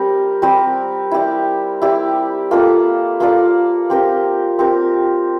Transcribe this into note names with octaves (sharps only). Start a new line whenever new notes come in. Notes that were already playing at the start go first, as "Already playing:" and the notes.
Already playing: G3 C4 G4 A#4
G3 C4 G4 A#4
E4 G4 D5
E4 G4 D5
A#3 F4 A4 D5
A#3 F4 A4 D5
C4 G4 A#4
C4 G4 A#4